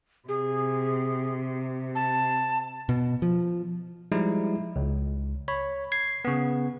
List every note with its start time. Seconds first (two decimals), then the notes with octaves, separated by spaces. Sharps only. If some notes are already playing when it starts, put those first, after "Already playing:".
0.28 C3 G#4
1.95 A5
2.89 B2
3.22 F3
4.12 F3 G3 G#3 D#4 E4
4.76 C#2
5.48 C#5 B5
5.92 G#6 C7
6.25 C#3 B3